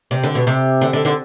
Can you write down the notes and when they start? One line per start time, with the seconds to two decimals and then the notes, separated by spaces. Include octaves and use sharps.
0.11 C3
0.24 D3
0.35 B2
0.47 C3
0.81 D3
0.93 D3
1.05 D3